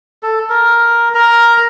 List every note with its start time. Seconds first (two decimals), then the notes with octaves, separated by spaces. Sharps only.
0.23 A4
0.49 A#4
1.15 A#4 A#5